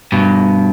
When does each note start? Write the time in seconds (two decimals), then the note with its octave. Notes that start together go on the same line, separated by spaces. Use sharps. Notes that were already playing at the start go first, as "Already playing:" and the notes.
0.12 G2 B2